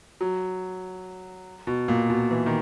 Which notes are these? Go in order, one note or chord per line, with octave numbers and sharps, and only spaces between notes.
F#3
B2
A#2
B2
E3
D#3